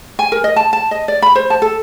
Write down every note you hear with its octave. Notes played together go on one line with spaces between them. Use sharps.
G#5
A#4
D#5
A5
A5
D#5
D5
B5
C5
A5
A4